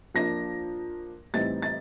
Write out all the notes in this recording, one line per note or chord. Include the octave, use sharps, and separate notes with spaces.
F3 A#3 D4 A#6
A2 E3 G3 C4 D#4 A6
A6